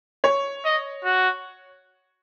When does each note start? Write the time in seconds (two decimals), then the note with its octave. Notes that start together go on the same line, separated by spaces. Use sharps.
0.24 C#5
0.64 D#5
1.05 F#4